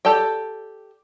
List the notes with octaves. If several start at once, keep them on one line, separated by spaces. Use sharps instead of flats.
G4 A4 D5 G5